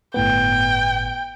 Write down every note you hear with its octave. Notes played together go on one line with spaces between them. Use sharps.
G1 A2 B3 G5